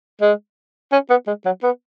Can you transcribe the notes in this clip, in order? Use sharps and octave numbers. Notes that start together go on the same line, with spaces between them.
G#3
C#4
B3
G#3
F#3
B3